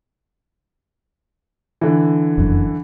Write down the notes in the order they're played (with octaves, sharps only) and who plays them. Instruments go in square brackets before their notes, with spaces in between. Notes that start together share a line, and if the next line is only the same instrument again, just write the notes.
[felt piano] D3 E3
[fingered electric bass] F1 F#2